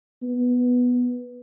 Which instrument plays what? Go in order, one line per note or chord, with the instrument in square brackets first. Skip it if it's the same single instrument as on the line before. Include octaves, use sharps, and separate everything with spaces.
[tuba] B3